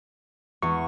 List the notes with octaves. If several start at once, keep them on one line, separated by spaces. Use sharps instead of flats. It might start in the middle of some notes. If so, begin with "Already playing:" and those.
E2 C#6